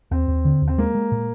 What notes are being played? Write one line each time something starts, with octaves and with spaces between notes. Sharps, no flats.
D#2 C4
D#2
D3
D#2
C4
G#3 A#3
G#3
A#2